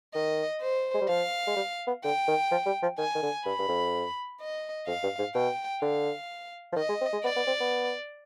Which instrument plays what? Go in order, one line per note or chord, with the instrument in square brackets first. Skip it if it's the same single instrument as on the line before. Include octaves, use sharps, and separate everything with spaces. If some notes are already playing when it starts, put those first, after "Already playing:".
[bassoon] D#3 [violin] D#5
[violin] C5
[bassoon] G#3
G3
[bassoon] F3 [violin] F5
[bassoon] G#3
G3
B3
[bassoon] D3 [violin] G5
[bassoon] D#3
F3
G3
F3
[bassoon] D#3 [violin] G#5
[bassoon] D#3
D3
[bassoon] G2 [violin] B5
[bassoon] G2
F2
[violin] D#5
[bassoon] F2 [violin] F5
[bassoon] G2
G#2
[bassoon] B2 [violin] G5
[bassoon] D3 [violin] F5
[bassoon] F3
[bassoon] D#3 [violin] D#5
[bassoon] G#3
C4
G#3
[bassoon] B3 [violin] D5
[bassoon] B3
C4
B3